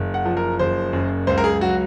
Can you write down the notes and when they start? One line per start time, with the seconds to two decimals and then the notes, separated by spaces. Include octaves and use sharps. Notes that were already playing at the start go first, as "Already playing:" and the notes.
Already playing: F#1
0.14 F#5
0.26 F3
0.37 A#4
0.59 F#1 C5
0.93 F#2
1.27 C#2 C5
1.38 A#4
1.44 G#4
1.61 F#3 F#4